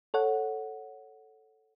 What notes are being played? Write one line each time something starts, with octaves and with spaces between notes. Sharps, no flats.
A4 C#5 F#5